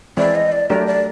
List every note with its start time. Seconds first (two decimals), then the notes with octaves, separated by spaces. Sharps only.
0.17 E3 G#3 C4 E4 D5
0.35 D#5
0.52 D5
0.70 F#3 A3 D4 G4 A#4 D5
0.87 D5